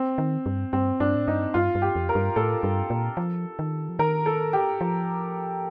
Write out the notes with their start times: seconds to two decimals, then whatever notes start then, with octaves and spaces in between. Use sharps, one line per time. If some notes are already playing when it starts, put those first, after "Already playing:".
Already playing: C4
0.18 D#3
0.46 G2
0.73 G2 C4
1.00 G2 D4
1.15 A2
1.28 G2 D#4
1.54 G2 F4
1.75 G2
1.82 G4
1.96 F2
2.09 A#4
2.15 G2
2.36 A2 A4
2.63 G2
2.90 A#2
3.17 F3
3.59 D#3
3.89 F3
3.99 D#3 A#4
4.26 A4
4.53 G4
4.81 F3